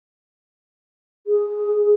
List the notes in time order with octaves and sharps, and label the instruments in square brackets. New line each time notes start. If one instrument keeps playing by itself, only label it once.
[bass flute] G#4